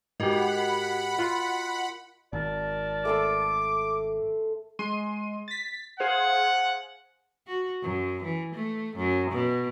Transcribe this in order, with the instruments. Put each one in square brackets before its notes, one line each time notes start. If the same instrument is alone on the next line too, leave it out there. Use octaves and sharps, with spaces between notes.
[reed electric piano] G#2 G4 [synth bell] F#4 A#4 D#5 [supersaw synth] F#5 B5
[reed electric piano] F4 C6
[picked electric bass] G#1 [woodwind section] A#4 D5 A5
[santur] A3 C6 E6 [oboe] D6
[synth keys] G#3 C6 D#7
A6 B6
[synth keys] G#4 C5 F5 [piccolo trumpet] F#5
[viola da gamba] F#4
F#2
E3
A3
F#2
B2